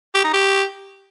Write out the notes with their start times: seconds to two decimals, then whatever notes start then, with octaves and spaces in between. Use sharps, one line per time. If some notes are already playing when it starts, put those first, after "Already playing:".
0.15 G4
0.24 D#4
0.33 G4